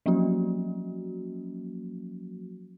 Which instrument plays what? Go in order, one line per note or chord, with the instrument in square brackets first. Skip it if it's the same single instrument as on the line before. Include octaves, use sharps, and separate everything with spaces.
[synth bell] F3 F#3 A#3 C#4 F#4